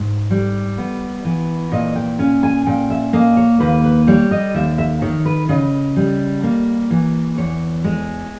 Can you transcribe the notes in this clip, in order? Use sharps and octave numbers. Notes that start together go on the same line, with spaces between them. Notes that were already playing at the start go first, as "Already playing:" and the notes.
Already playing: G#2
G3
B3
E3
A#2 D#5
G5
C#4 G#5
G#5
A#2 G5
E5
A#3 D#5
C#5
D#2 B4
B4
G3 C#5
D#5
D#2 E5
E5
D#3 C#5
B4
C#3 D#5
G3
A#3
E3
E2 C#5
G#3